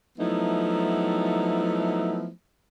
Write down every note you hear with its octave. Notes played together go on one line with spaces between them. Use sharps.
F3 F#3 A3 B3 D#4 E4